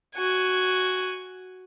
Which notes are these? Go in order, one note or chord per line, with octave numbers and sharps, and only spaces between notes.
F#4 G#5